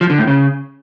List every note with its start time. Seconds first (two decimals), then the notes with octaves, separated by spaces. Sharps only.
0.01 F3
0.10 D3
0.18 A2
0.27 C#3